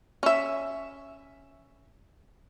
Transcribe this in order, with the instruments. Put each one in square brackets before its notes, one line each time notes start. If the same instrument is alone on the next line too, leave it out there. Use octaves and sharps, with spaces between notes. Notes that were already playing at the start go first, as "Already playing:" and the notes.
[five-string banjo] C#4 E5